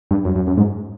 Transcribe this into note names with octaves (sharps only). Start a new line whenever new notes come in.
G2
F#2
F#2
F#2
G#2